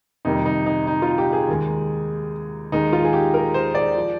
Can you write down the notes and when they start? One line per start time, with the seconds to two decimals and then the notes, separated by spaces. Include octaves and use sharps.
0.25 F2 C3 D#3 G3 A#3 D#4
0.46 D#4
0.66 D#4
0.87 D#4
1.02 F4
1.18 G4
1.33 G#4
1.48 D#2 D#3 G#3
2.72 D#2 D#3 G#3 D#4
2.93 F4
3.04 G#4
3.13 G4
3.34 A#4
3.54 C5
3.75 D5
3.97 F3